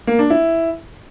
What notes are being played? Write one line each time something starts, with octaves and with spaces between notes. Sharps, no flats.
A#3
D4
E4